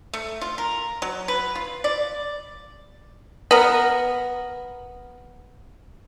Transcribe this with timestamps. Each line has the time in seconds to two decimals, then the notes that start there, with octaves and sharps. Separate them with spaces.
0.14 A3
0.41 F4
0.58 A#4
1.02 F#3
1.28 B4
1.55 F4
1.84 D5
3.51 B3 A#4